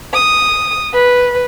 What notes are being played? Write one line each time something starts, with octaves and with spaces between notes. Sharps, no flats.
D#6
B4